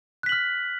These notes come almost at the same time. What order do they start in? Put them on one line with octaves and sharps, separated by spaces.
F#6 B6 F#7 F6